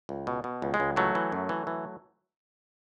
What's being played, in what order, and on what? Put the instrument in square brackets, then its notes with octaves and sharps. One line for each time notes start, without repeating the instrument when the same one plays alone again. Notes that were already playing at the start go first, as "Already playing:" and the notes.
[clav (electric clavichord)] C#2
B2
B2
C#2
G#3
C#2
E3 F#3 A3
E3
F#2
E3
E3